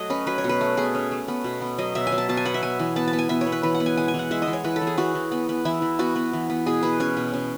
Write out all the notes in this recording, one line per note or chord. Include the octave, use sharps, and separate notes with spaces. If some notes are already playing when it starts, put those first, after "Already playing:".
Already playing: F#3 A3 D#5
C#4 B4
F#3 B4
C#5
B2
B4
A3
B2 G#4
C#4
A3
B3
B2
B3
F#3 D#5
B2 E5
G#5
F#3
A5
B2 A5
G#5
B3 F#5
E5
B3 G#5
E3
B3 A5
A5
B3
G#5
B3 E5
C#5
B3
B4
E3 B4
F#5
B3
G#5
G#3 G#5
G#5
E3
F#5
G#3 E5
D#5
E3
C#5
E3 B4
A4
E3
G#4
E3 F#4
E3
B3
B3
E3 E4
E3
B3 F#4
B3
E3
B3
B2 G#4
B2 B4
C#4 C#5
B2
C#4